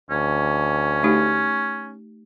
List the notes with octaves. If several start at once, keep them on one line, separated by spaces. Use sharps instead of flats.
D2 C#4
A3 D#4 G4